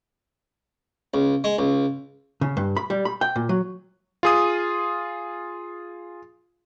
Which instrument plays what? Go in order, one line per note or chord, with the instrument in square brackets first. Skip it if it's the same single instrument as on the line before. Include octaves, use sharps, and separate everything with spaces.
[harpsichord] C#2
G#3
C#2
[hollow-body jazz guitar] C#3
G2
B5
G3
B5
G5
A#2
F#3
[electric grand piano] F4 G#4 D#6